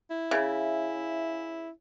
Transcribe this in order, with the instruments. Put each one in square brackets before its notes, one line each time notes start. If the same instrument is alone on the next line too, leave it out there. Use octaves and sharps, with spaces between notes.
[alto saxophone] E4
[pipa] C#3 [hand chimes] E5 F5 G#5